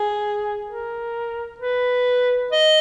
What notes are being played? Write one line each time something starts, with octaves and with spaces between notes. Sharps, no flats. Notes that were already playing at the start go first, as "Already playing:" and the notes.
Already playing: G#4
A#4
B4
D#5